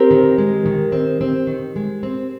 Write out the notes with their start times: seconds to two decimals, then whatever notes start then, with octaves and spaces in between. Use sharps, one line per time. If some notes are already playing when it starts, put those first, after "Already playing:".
Already playing: C4 G4 A#4
0.11 D#3
0.38 G#3
0.66 D#3
0.92 C4
1.21 C4
1.47 D#3
1.76 G#3
2.03 C4